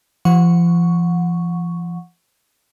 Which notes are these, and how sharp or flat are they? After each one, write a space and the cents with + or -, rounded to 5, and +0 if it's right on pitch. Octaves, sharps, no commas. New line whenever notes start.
F3 -35 F#5 -20 C#6 +0